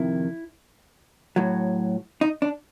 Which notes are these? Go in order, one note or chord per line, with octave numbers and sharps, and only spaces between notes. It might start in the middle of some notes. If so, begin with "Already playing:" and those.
Already playing: F2 C3 D#3 E4
A2 F#3
D#4
D4